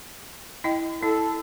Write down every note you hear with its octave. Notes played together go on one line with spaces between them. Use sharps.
E4 D#5 G5
E4 A4